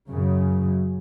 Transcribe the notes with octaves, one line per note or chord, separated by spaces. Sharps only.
F#2 C#3